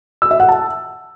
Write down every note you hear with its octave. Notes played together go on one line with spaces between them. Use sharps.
E6
E5
F#5
A5